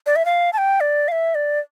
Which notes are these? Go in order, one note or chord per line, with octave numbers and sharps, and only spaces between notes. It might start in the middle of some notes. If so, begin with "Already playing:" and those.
D5
E5
F5
A5
G5
D5
F5
E5
D5